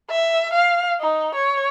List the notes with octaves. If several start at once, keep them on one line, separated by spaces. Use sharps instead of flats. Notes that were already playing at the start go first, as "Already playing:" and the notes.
E5
F5
D#4
C#5